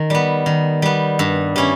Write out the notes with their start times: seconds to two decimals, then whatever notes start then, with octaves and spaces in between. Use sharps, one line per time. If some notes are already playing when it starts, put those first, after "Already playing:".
Already playing: D#3
0.10 G3 B3
0.46 D#3
0.82 G3 B3
1.19 G2
1.56 G3 C#4 E4